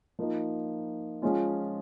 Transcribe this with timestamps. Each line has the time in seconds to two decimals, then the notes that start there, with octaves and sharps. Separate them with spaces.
0.19 F3 A#3 D#4
1.22 F3 G#3 C#4 F4